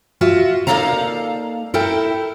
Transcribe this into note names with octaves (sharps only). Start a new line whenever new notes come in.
F4 F#4 E5
A#3 D#4 A4 D5 F5 A#5
E4 A4 A#4 G5